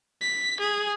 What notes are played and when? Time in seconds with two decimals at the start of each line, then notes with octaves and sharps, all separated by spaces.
0.21 B6
0.60 G#4